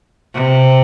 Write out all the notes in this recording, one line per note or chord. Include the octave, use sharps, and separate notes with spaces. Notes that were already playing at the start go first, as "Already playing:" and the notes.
C3